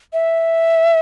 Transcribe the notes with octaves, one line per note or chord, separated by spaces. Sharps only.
E5